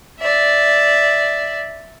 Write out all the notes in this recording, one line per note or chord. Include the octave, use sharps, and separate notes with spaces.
D5 E5